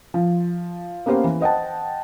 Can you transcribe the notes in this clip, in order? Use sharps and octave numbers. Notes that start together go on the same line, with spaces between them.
F3
A#3 B3 C#4 G4 C5 F5
E3
C5 D#5 F#5 G5 A5